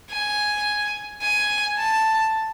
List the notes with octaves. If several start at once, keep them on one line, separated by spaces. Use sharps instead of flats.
G#5
G#5
A5